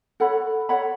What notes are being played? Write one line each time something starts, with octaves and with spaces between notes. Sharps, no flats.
A4 C#5 F#5 B5
A4 C#5 F#5 B5